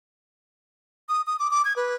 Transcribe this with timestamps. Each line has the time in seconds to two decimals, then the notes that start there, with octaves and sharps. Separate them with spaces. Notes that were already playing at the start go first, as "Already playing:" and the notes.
1.09 D#6
1.27 D#6
1.39 D6
1.51 D6
1.65 G#6
1.76 B4